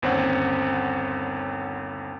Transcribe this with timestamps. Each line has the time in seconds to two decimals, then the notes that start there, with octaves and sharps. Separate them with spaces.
0.02 G1 D#2 C4 C#4 C#5 F#5